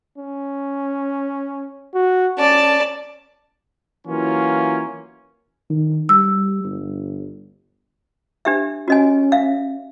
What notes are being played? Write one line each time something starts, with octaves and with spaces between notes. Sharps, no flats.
C#4
F#4
C#4 D5 A5
E3 F#3 A#3 C#4 F4
D#3
G3 E6
G1
D4 G4 E5
C#4 F#4 D#5 G#5
E5 F5